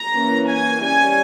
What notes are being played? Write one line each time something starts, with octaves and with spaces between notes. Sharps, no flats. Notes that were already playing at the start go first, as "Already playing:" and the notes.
Already playing: A#5
E3 A#3 C#4
G#5
G3 C#4 G#5